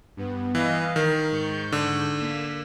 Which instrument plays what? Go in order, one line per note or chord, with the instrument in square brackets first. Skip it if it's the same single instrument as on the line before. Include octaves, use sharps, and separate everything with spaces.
[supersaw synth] G2 B3
[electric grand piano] E3 [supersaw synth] B4 D#5 F5
[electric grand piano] D#3 [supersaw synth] A#4
[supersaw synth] G#2 C#6 G6
[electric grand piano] D3
[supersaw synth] A#3 B6 E7